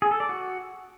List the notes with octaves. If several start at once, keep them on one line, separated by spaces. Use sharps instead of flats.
G#4
A4
D5
F#4